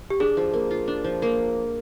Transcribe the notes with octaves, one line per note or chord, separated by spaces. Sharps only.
G4
D4 G#4
F3
A#3
F4
D4
F3
A#3